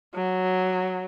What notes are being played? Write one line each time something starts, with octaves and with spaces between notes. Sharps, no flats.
F#3